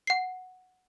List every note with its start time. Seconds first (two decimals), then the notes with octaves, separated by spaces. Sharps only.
0.07 F#5 C7